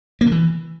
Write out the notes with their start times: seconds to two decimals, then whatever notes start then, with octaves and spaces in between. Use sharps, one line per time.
0.21 A#3
0.26 D3
0.32 E3